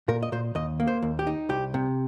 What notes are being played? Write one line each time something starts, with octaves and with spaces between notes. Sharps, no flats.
A#2 A#4
D#5
A#2 C5
D#2 D#5
A#3
C5
D#2
G4
D#4
C2 G4
C3